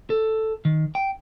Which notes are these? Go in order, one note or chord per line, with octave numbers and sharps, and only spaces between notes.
A4
D#3
G5